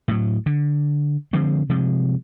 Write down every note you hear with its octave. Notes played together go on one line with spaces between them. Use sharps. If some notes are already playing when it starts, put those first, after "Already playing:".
A2 F#3
D3
D3 F3 G#3 C4
C3 F3 G#3